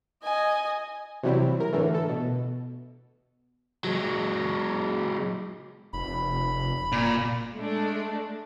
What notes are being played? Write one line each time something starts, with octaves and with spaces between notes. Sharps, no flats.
D#5 G#5
C3 E3 F#3 G3 C4 E4
A#4
A2 D3 E3 A3
A4
B2
F#3 G#3
F1 B5
A#2
G#3 A3 D4